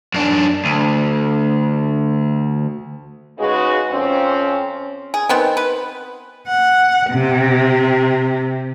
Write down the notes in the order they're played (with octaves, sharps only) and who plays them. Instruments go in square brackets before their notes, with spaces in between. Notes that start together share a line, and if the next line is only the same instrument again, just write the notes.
[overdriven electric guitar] F#2 D4
D2
[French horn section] C#3 G#3 D#4 F#4 G#4 B4
F2 C4 C#4
[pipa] G#4
D#3 B3 C4
B4
[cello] F#5
C3